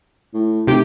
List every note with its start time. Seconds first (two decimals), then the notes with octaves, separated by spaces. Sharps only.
0.34 A2
0.67 F1 C3 G4 D7